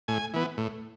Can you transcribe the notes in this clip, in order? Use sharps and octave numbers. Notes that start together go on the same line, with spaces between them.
A2 G#5
E3 B3
A2